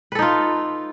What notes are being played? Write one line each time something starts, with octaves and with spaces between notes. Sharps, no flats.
D#4 F4 A4 B4